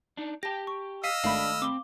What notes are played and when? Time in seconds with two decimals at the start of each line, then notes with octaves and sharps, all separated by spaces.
0.17 D4 D#4
0.43 G4 G5 A5 A#6
0.67 C#6
1.04 D#5 F5 E6 F6 B6 D#7
1.24 G#1 A3 D4 F5 B5
1.62 C4 D6 G7